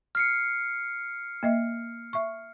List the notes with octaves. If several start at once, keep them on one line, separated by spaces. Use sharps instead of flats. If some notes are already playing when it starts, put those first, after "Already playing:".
F6 C7 C#7
A#3 D#5 E5
E5 C#6